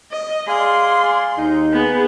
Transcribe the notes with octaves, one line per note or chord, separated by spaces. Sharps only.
D#5
G#4 D5 F5 C6
D#2 D#4
B3 G#4